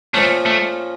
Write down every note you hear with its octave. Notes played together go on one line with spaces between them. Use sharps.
A#2 F3 A3 A#3 C#4
A3